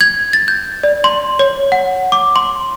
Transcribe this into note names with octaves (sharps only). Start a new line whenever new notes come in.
G#6
A6
G6
D5
C6
C#5
F#5
D6
C6